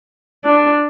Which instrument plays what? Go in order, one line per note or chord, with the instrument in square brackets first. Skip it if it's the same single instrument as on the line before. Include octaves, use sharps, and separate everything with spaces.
[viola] D4